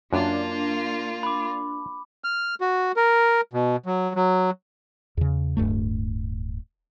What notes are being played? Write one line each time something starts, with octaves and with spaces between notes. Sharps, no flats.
F#2 A#3 D4 F4
B5 D6
F6
F#4
A#4
B2
F#3
F#3
E2 C#3
D1 G2 A3